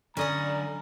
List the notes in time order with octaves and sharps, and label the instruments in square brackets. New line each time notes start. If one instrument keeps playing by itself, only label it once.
[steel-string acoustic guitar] D3 [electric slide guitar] F#3 D5 [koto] C#4 D#5 F#5 [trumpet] A#5